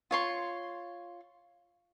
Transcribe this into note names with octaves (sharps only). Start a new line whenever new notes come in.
F4 C#5 C6